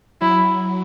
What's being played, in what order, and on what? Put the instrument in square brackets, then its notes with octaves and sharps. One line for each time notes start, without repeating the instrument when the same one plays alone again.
[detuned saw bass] F#3 [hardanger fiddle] E4